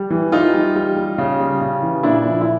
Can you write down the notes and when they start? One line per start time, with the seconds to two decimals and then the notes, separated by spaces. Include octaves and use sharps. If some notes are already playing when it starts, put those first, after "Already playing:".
Already playing: G3
0.10 E3
0.32 E3 D#4 F4
0.54 G3
0.75 G3
0.96 G3
1.18 C#3
1.40 G3
1.61 C#3
1.83 E3
2.03 A#2 D4 E4
2.26 F3
2.41 E4